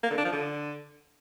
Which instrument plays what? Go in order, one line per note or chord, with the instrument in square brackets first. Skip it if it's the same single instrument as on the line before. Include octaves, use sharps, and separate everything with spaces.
[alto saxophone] A#3
D3
D4
F3
D3